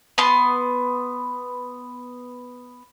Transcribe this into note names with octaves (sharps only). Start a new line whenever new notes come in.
B3 C6